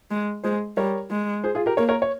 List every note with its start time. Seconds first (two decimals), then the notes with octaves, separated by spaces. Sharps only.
0.11 G#3
0.44 G#3 G#4 C5
0.77 G3 A#4 C#5
1.10 G#3
1.44 G#4 C5
1.55 F4 G#4
1.66 G4 A#4
1.77 A#3 A#4 C#5
1.89 A#4 C#5
2.02 C#5